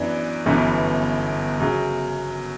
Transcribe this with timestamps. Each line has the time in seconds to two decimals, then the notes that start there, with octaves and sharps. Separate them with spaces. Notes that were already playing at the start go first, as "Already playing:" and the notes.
Already playing: F#2 E3 B3 D4
0.46 G1 F#2 E3 B3
1.60 F#2 C#3 F#3